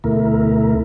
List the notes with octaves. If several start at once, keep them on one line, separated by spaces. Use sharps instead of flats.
D2 B2 A3 E4 A#4